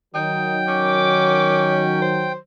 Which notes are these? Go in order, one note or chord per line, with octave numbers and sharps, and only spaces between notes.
D#3 F#3 D#4 G5
C#4 D6
C5